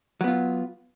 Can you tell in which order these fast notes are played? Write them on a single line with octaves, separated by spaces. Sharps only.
F#3 B3 F4